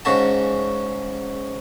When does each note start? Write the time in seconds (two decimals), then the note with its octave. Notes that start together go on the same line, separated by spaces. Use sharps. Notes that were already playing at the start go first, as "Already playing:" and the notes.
0.05 G#2 C#3 F#4 A5